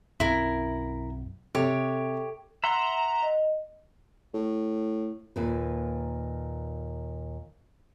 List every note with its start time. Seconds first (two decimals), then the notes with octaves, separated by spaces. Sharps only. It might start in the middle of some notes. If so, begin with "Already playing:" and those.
0.20 B1 F#2 C4 E4 A#4
1.55 C3 G4 A4 C#5
2.64 E5 F#5 A#5 C6
3.22 D#5
4.34 A2
5.36 D#2 A#2 B4